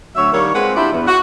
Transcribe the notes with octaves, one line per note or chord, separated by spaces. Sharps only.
D2 F#3 C#5 E5
D#3 G3 A#3 C#5
G#3 C4 F4 B4 F#5
D4 E4 F4 G4 D5
E2
F#4